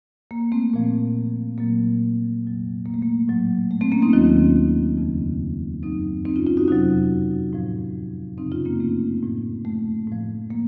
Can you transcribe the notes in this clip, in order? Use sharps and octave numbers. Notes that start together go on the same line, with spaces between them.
A#3
A3 C4
A#2 F3
A#2 F#3 A#3
F2 C3 F#3
A#3
A3
A#3
A2 F#3
A3
A3 C4
A#3 C#4
C4 D#4
D#2 D#3 F#3 C#4 F4
F2 C#3 F3
F#2 D#3 F#3 C4 D#4
C4 D#4
C#4 F4
C#4 F4
D#4 F#4
F2 C3 F#3 D#4 F#4
A2 F3
F#2 C#3 F3 C4 D#4
C#4 F4
A#3 C#4
A3 C4
A2 F3
A3
A2 F3
A#3